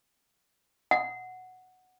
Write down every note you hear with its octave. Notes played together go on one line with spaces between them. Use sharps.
F#5